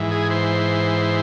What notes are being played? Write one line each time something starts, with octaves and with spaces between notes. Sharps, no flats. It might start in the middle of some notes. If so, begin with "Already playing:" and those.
Already playing: G#2 E3
G#4
C5